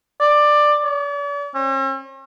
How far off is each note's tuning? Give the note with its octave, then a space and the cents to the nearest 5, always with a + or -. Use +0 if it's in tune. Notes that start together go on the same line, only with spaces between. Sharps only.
D5 +15
D5 -45
C#4 -45